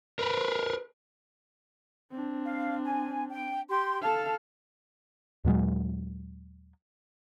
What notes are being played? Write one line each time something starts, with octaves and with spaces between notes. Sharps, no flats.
A#4 B4
C4 D4
F5
G#5
G5
G4 C6
A4 F5 A5
D#2 A#2 F#3 G#3